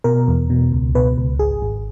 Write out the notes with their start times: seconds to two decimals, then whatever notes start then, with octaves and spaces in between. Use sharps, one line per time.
0.04 B2 A#4
0.28 E2
0.50 B2
0.72 C#2
0.95 B2 B4
1.18 C#2
1.39 G#1 G#4
1.62 G#1